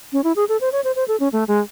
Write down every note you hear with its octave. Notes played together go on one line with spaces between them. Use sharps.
C#4
E4
G#4
A4
C5
C#5
C5
C5
A4
C#4
A3
G#3